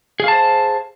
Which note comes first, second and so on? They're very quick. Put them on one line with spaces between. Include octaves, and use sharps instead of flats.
G#4 F5 A5 C5